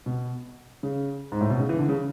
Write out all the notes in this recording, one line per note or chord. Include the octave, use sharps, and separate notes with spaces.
B2
C#3
G#2
A2
B2
C#3
E3
D3
C#3